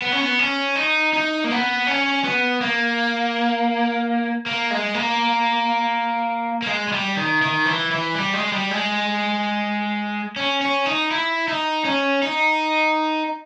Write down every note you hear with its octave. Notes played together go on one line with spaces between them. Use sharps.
B3
C#4
B3
C#4
D#4
D#4
A#3
B3
C#4
B3
A#3
A#3
G#3
A#3
A#3
G#3
G#3
G3
D#3
D#3
E3
E3
G3
G#3
G3
G#3
C#4
C#4
D#4
E4
D#4
C#4
D#4